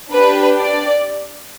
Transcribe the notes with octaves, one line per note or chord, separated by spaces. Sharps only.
D4 G4 B4
D5